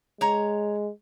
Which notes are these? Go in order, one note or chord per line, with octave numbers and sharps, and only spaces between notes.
G#3 C#5 A#5